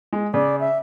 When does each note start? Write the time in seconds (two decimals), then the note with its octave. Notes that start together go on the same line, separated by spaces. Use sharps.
0.13 G#3
0.34 C#3 D5
0.60 E5